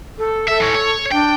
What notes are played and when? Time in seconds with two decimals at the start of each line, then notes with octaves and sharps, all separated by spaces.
0.18 A4
0.48 A4 E5
0.61 E3 C#5
0.75 C#5
1.11 D4 G5